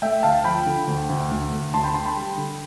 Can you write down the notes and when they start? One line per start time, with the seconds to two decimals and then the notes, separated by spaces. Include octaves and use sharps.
0.02 A3 E5 G5
0.23 D2 F5 A5
0.44 F3 G5 B5
0.66 D3
0.87 D2
1.10 D2
1.31 D2
1.52 D2
1.74 D2 A5 C6
1.84 G5 B5
1.94 D3 A5 C6
2.06 G5 B5
2.17 G3
2.38 D3